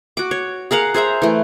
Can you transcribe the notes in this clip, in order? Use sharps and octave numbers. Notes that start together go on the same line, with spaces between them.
F#4 D6
C#5
G#4 A#4 F5 F#5
G#4 C5 E5 A#5
E3 A3